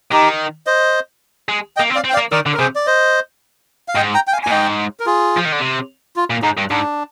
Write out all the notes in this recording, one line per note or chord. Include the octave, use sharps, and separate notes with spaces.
D#3 D#4 G4
C5 D#5
G#3
D#5 G5
A#3
C4
D5 F5
C4
G5
D5 F5
A#3
D#3 A#4 D5
D3
A#4
C3 G#4 C5
D5
C5 D#5
F5
G#2 D#5 G5
G5 A#5
G5
F5 G#5
G#5
A#2
G#2 D#5 G5
A#4
F4 G#4
F3
D#3
D3
C3
F4
A#2
G#2 D#4
G2
G#2 D4